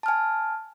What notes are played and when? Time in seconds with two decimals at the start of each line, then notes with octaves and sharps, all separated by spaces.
0.03 A5
0.06 F6
0.08 G#5